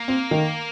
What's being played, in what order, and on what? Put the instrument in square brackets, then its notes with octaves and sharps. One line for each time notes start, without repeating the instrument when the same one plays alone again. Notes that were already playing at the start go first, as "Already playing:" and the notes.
Already playing: [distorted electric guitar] A#3
[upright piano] C4
D#3